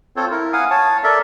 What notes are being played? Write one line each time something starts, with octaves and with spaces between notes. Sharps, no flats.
C4 F4 A4 C5 C#5
E4 A#4
F5 F#5 G#5 D#6
C#5 A5
A4 A#4 D5 E5